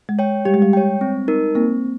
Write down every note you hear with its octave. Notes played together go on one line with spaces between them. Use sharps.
G#3
C#5 G5
G3 G4
G#3
G3
C#5 G5
C4
D#4 A#4
A#3 C4